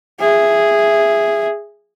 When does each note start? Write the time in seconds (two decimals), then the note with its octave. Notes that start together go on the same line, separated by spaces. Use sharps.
0.20 G#4 E5